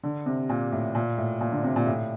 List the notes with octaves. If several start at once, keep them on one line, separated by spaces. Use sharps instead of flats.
D3
C3
A#2
A2
A#2
A2
A#2
D3
C3
A#2
A2